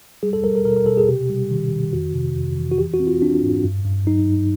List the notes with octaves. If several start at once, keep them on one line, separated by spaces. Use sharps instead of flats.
G3 G#4
A4
G3 A#4
A#4
B2 A#4
A#4
B2 A4
G#4
C3 G4
G3
D#3
D#3
F2 F#4
C3
F2
E3
F#4
E3 G4
F#4
C4
F4
C4 D4
G#2
G2
G2
F#3 D#4
G2